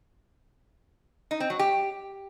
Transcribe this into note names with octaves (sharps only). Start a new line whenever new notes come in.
D#4
C4
F#3
G4